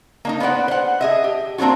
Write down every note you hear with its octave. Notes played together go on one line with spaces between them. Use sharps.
A#3 D4 D#4
B3 B4 C5 D5 F#5
C5 F#5
G#4 D#5 E5
G4
A#3 C4 D4 F4 F#4